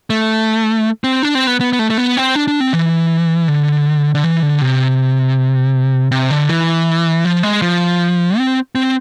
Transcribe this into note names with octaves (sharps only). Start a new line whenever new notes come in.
A3
C4
D4
C4
B3
B3
B3
A3
A3
B3
C4
D4
D4
C4
E3
D3
D3
E3
D3
C3
C3
D3
E3
F3
G#3
F3
C4
C4